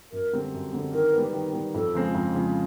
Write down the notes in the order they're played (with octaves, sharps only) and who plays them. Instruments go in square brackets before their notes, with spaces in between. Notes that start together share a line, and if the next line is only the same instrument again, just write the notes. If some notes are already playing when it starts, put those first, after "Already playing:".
[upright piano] F#2 [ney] A#4
[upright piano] D3 G3 C4
F#2
D3 G3 C4
[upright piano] D#3 [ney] A#4
[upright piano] B3
G3
D#3
G3 B3
[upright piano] F2 [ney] A4
[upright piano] C#3 F3 G#3 C4
F2
C#3 F3 G#3 C4